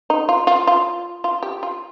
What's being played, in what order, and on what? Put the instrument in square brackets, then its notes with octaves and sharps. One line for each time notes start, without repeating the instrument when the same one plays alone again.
[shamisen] D#4
F4
F4
F4
F4
G4
F4